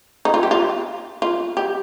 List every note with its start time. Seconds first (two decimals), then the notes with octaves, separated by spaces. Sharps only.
0.25 D#4
0.34 F4
0.43 G4
0.51 F4
1.22 F4
1.57 G4